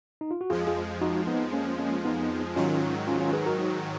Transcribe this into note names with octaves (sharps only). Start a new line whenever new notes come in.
D#4
F4
F#4
F2 F3 G#3 F4 G#4
F4 G#4
D#4 F#4
B3 D#4
A#3 C#4
A#3 C#4
B3 D#4
G#2 D#3 F#3 C#4 F4
C#4 F4
C#4 F4
G#4 B4
F#4 A#4
D#4 F#4